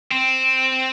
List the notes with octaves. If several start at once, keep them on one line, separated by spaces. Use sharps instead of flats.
C4